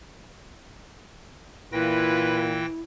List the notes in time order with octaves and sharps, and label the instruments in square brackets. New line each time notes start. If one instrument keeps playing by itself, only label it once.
[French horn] A#2 [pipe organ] E3 G5 A#6 [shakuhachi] E4 [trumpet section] F4 B4